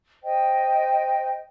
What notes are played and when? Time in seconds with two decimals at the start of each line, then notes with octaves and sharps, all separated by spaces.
0.23 C5 D#5 G5